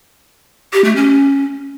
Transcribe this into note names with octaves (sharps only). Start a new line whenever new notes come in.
G4
A3
C#4